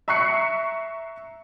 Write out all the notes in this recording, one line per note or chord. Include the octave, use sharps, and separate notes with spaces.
E5 A#5 C#6 F#6 C7 C#7